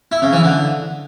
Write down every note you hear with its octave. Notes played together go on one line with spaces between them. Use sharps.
E4
C#3
E3
D3